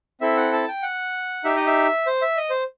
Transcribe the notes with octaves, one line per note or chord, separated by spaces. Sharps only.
C4 E4 A4 E5
F#5
A5
G5
F#5
D#4 G4 E5
D#5
E5
C5
E5
D#5
C5